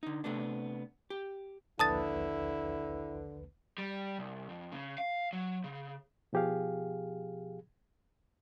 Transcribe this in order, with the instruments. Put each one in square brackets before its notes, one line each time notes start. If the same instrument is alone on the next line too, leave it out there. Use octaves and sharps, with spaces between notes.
[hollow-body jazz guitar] D3 D#4
C3 A3 B3 D4
G4
[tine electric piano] A#1 D#2 B4 [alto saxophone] D3 [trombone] E4 [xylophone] A5 D#6 A6
[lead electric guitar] G3
C2
F2
C#3
F5
F#3
C#3
[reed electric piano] B2 F3 G4 G#4 F5